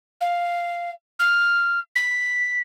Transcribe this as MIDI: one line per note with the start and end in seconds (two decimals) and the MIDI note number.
0.21 0.90 77
1.19 1.79 89
1.95 2.59 95